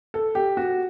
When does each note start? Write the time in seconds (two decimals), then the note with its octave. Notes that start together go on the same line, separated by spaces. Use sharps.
0.14 A4
0.35 G4
0.57 F#4